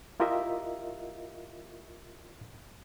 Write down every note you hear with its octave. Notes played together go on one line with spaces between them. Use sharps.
E4 F4 G4 A#4 D#5 E5